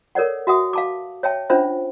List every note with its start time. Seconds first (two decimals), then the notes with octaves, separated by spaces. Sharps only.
0.15 A4 A#4 C#5 D5 F#5
0.47 F#4 E5 F#5 D#6
0.73 F5 A5 D6
1.23 C#5 E5 G5 A5
1.50 C#4 D4 F4 C5 E5